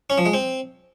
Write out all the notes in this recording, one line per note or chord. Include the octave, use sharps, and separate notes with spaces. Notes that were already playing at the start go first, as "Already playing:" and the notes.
C#4
F3
G#3
C4